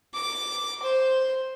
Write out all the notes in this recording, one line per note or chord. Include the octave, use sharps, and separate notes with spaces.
D6
C5